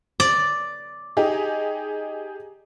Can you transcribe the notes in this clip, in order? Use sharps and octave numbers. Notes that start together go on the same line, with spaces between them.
D5
D#4 G4 G#4